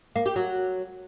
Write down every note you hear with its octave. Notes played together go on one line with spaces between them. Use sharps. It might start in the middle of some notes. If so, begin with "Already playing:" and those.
A#3
G4
F#3